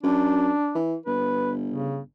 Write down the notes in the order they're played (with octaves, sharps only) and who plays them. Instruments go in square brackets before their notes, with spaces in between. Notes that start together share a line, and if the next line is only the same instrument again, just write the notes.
[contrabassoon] F#2 [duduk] D4
[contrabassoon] E3
[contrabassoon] G1 [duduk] B4
[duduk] C#3